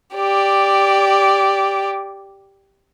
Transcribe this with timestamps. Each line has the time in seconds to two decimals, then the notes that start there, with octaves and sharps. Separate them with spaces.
0.14 G4 D5